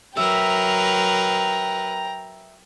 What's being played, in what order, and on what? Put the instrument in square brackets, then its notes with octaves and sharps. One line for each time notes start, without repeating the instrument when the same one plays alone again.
[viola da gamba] F#3 A#4 B4 [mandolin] E5 [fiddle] G5 A#5